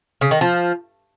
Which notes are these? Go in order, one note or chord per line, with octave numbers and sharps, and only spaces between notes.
C#3
D#3
F3